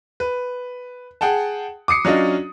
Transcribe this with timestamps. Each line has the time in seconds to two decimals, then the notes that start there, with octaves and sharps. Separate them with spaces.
0.20 B4
1.21 G#4 F#5 G5 A5
1.88 D6 D#6 C7 C#7
2.05 F#3 C#4 D4 F4 D#5